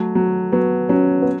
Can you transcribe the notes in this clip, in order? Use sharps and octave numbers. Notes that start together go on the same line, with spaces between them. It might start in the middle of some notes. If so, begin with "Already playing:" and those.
Already playing: F#3 A3
F#3
F#3 B3
F#3 C#4
B3